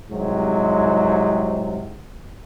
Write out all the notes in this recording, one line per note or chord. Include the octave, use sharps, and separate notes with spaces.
C2 G#2 C3 F#3 G#3